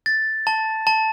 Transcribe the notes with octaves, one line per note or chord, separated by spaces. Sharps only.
A6
A5
A5